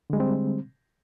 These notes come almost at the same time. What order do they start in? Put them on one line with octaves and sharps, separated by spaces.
D3 G#3 G3 C4